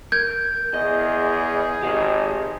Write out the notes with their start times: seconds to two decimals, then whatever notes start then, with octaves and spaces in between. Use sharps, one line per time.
0.12 A#4 G6 G#6
0.74 E2 G#4 D#5
1.83 G#1 G4 D#5